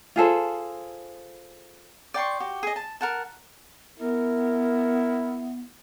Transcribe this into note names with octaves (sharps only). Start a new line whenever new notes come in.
F4 G#4 A4 C5
D5 G5 C6 C#6
F#4 G4
G#4 D#5
A5
A#4 F#5 A5
B3 E4 A#4